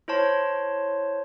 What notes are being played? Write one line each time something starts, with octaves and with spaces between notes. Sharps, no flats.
E4 C5 C#5 A5 C6